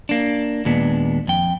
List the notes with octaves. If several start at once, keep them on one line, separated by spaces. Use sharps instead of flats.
A#3 D4
D#2 A#2 G#3 B3 D4
F2 G5